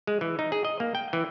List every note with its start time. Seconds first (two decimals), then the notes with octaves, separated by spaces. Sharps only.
0.07 G#3
0.21 E3
0.39 D#4
0.52 G#4
0.65 D#5
0.80 A#3
0.95 G5
1.13 E3